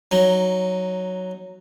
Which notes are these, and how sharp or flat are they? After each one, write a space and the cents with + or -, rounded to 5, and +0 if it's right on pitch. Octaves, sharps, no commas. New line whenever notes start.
F#3 +0 D#4 +0